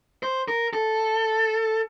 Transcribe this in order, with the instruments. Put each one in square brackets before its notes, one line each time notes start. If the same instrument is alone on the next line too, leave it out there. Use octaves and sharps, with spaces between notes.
[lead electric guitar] C5
A#4
A4